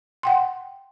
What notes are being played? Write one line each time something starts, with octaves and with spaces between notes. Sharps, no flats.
F#5 G5 C6